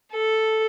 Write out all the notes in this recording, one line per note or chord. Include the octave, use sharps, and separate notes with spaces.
A4